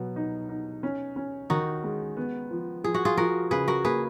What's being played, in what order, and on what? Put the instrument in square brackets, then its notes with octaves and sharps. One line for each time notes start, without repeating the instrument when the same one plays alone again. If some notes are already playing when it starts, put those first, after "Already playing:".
Already playing: [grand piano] B2 F#3 [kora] B3
[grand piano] D#4
D#4
C#4
C#4
[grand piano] D#3 [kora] D#4 F#4
[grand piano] G#3
B3
F3
[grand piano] F3 [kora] G#4
[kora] F#4
F4 G#4
[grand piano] F3 [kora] F#4 A#4
[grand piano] C#3 [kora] G#4 B4
[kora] F#4 A#4
[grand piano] A#3 [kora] G#4 B4